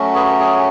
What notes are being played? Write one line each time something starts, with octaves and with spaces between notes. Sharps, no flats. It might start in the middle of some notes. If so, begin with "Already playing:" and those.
Already playing: F#3 A3 C#4 F#4
G#4 B4
G#4